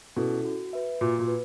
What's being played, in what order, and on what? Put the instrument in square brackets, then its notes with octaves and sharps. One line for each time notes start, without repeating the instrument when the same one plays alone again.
[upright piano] B2 [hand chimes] C#4 E4 A4
[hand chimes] F#4
B4 E5
[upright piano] A#2 [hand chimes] F#4
[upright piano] A#2
[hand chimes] B4